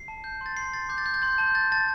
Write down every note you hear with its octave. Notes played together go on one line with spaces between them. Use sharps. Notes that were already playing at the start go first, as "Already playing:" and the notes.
Already playing: C7
A5
G6
C6 A6
C6 C7
C6 A6
D6 G6
A6
G6
A6
C6 G6
A5 G6
G6 A6
A5 A6